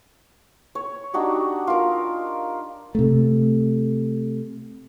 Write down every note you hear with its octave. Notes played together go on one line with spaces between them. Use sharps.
C#5
D4 D#4 F#4 G4
F4 A#4
C3 A3